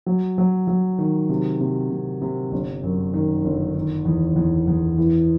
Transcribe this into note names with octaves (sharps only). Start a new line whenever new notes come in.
F#3
F#3
F#3
D#3
C3
C3
C3
C3
G1
F#2
D#3
G1
D#3
E2
E2
E2
E3